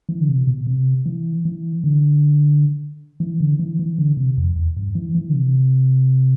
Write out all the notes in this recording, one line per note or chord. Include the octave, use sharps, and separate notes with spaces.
E3
D3
C3
B2
C3
E3
E3
D3
E3
D3
E3
E3
D3
C3
F2
E2
G2
E3
E3
D3
C3